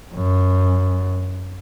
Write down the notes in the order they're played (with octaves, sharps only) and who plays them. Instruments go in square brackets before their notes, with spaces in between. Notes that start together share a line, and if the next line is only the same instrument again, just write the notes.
[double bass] F#2